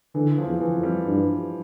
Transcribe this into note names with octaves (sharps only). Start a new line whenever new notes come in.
D3 E3
F3
E2
E3
F2
G3
G2